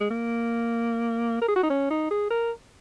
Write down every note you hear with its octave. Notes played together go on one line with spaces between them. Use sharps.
G#3
A#3
A#4
G#4
F#4
D#4
C#4
D#4
G#4
A#4